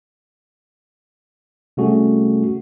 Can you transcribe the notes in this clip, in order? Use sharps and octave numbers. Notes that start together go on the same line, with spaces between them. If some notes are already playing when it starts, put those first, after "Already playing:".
C3 G3 A3 C#4 F#4 G#4